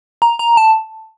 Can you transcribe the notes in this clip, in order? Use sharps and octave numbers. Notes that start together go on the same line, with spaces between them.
A#5
A#5
A5